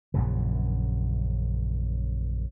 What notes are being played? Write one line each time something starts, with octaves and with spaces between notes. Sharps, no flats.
A#1 F#2 C#3